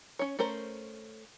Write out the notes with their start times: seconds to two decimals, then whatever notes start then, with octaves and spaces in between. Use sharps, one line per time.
0.19 C#4 C#5
0.39 A3 C#4 A#4 C5